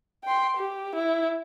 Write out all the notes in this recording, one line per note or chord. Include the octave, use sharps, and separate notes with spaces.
G5 C6
G4
E4